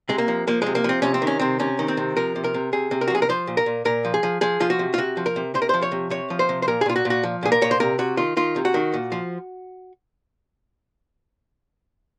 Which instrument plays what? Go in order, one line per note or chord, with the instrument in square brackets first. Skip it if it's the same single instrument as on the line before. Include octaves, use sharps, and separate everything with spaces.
[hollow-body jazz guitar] C3 G#3
A#3
F3
F3 A#3
C3 G#3
A#3
F3 C4
C3 C#4
C4
D#3
C#4
C3 C4
C3 C#4
D#3
C4
C3
F3 A#4
C3
A#4
C3
C3 G#4
C3
A#4
F#4
F3 G#4
A#4
F3 C5
A#2
A#4
A#2
A#2 A#4
F3
G#4
F3
F3 G#4
F3 F4
F#4
C3
F4
C3 F#4
F3
A#4
C3
C3 C5
A#4
F3 C5
C#5
C3
C3 C#5
F3
C5
C3
C5
A#2 A#4
G#4
A#2 F4
F#4
A#2
F#4
F3
A#2 G#4
A#4
A#2 C#5
C5
C3 A#4
C3 F#4
D#3 F4
D#3 F4
C3
F#4
D#3
A#2
F3